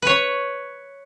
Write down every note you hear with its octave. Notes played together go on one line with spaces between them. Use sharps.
B4 C#5